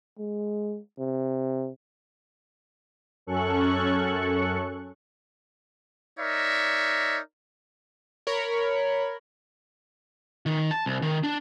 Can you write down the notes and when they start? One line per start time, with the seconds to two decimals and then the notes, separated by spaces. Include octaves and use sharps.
0.19 G#3
0.99 C3
3.27 F#2 C#4 A4 C#6 F#6
6.20 D#4 A#4 C#5 D5 E5
8.27 A#4 C#5 B5
10.46 D#3
10.71 A5
10.86 C2
11.02 D#3
11.24 D4